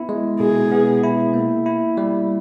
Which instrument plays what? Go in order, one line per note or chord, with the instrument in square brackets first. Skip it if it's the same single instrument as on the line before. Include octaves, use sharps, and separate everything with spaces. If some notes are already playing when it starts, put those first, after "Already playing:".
Already playing: [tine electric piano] B3 E4
G#3
[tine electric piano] B2 [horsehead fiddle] G#4
[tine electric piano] B3
E4
A#3
E4
G3